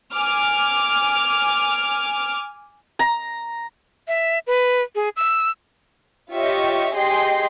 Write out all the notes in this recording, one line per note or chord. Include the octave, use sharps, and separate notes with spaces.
G#5 D6 F6
A#5
E5
B4
G#4
E6
F4 G4 C#5 D#5 E5 C#6
G4 G#4 D#5 G5 C6 C7